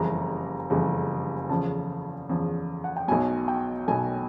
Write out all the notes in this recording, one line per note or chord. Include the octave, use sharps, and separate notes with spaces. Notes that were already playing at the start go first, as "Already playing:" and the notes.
Already playing: F#1 F2 C#3 E3 G3 A#5
F#1 F2 C#3 E3 G3
E2 C#3 F3 A5
E2 C#3 F3
F#5
G5
B1 B2 F#3 G#5
G5
B1 B2 F#3 G#5